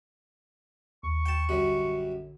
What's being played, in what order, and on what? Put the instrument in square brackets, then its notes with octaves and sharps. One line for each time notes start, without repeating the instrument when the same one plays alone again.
[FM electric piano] D#2 [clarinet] C#6
[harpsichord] G5 A5
[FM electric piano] A#1 D3 F#3 [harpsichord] F#2 G3